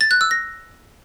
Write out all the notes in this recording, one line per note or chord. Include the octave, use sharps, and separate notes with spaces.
A6
F#6
E6
A#6